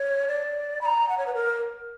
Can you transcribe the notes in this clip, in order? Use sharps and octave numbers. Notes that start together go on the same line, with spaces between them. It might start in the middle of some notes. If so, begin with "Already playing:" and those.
Already playing: C#5
D5
B5
A#5
F#5
C#5
B4
A#4